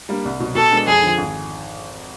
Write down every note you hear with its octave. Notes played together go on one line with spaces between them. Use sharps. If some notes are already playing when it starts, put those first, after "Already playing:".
G3 A#3 D4
C2
B2 F#3
B2 A4
G#3 B3 D4
F2 G#4
D3 F3
G#1